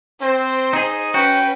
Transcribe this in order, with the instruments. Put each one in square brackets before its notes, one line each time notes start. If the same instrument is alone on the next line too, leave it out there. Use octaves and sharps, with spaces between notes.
[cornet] C4 [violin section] C5
[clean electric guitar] D#4 G#4
[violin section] C#4 B4 [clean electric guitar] F#4 [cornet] G5